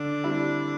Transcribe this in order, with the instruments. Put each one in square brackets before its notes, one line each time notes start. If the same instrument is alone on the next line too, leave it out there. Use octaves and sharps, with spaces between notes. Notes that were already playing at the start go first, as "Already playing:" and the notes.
Already playing: [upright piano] D3 [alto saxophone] D4
[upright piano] G3 C4 E4